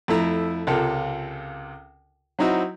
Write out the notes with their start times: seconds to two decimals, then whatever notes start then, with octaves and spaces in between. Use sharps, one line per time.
0.08 F2 A3 E4 A#5
0.67 C#2 C3 F4 A4 A#4 F5
2.39 F#3 C4 D#4 E4 F#4